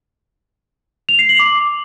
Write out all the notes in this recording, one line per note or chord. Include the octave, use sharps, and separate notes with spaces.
F7
C7
F#7
D6